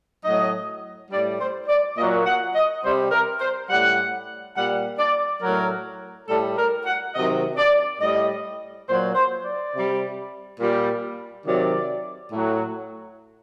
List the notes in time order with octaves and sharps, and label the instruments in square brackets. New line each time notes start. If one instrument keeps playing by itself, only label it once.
[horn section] A2 F#3 D#5
A2 G3 D5
C5
D5
A#2 D#5
F#3
F#5
D#5
C3 G3 C5
A#4
C5
A2 G3 F#5
A#2 G3 F#5
D5
A2 F#3 A#4
A2 G3 A4
A#4
F#5
C3 D#3 F#3 D#5
D5
A2 G3 D#5
A#2 F#3 C5
C5
D5
C3 G3
A#2 G3
C3 D#3 F#3 D5
A2 F#3